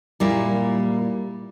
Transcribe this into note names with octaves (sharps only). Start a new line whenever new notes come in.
A#2 G3 A#3 E4